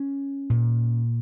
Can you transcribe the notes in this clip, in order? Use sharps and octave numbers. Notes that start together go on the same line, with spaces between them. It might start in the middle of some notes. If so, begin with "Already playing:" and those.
Already playing: C#4
A#2